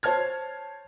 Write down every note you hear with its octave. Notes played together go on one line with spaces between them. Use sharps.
C5 C#5 A5 F6 G#6